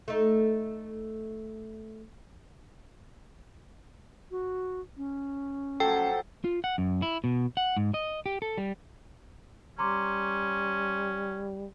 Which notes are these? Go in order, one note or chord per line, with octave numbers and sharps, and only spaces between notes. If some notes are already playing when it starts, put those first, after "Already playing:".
A3 D#4
F#4
C#4
F3 F#3 A3 A4 G5
F4
F#5
F#2
E4
B2
F#5
G#2
D#5
G4
A4
G3
G3 C#4 A#5 C6 D6